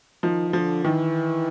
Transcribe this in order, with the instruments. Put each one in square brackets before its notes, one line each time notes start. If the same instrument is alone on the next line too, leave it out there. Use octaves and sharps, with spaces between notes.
[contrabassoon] D#3 [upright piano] F3
[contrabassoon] D#3
[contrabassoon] D3 [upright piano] F3
[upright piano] D#3 [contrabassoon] E3